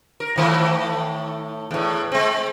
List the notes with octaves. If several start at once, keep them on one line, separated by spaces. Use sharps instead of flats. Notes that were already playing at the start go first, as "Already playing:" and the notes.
A#4
A2 D#3 A3
E2 A2
G#3 C4